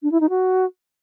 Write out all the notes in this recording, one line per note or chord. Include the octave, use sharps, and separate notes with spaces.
D4
E4
D#4
F#4